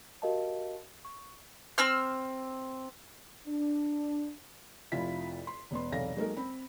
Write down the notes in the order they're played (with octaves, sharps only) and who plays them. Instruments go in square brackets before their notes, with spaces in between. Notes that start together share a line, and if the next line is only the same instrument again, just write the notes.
[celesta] F#4 G4 A#4 D#5 F5 A5
C#6
[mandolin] C4 E6 F6
[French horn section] D4
[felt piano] F1 F2 E4 F4 B6
C6
E1 B3 C6
E1 B1 C3 A4 F5 A#6
F#3 G#3 A#3 D#4 A4 A#4
C4 B5